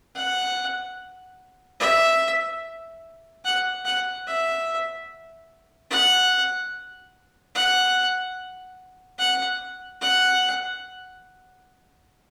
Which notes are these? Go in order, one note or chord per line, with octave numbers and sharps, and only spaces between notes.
F#5
E5
F#5
F#5
E5
F#5
F#5
F#5
F#5